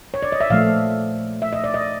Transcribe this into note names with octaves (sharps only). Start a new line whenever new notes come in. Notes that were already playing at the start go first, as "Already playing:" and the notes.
C#5
D5
D#5
E5
A#2 F3 A3 F5
E5
D#5
D5
D#5